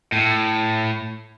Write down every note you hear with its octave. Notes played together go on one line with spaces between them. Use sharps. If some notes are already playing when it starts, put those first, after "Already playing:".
A2